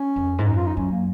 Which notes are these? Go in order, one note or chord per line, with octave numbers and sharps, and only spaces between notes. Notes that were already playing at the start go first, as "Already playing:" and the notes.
Already playing: C#4
F2
G#2
F#2 D#4
F4
D#4
F#2 C#4
A#3